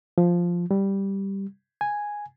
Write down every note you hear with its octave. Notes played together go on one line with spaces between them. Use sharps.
F3
G3
G#5